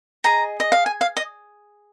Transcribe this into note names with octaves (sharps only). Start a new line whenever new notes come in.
G#4 D#5 A#5
D#5
F5
G#5
F5
D#5